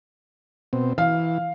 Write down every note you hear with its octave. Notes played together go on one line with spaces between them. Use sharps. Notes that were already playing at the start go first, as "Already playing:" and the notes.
B2 C4
E3 F5